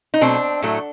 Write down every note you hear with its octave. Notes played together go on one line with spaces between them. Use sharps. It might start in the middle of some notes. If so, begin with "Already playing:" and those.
D#4
B2 F#3 A3 C4 D4
A2 F#3 A3